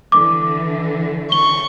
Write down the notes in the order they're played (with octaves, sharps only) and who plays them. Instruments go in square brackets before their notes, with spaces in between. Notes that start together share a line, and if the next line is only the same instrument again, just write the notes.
[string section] D3 E3 [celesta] D6
[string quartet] C#6 [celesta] G7